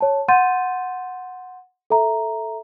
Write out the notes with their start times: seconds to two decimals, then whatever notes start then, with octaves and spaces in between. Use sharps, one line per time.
0.01 C#5 A5
0.28 F#5 C6 G6 A6 D#7
1.90 A4 E5 A#5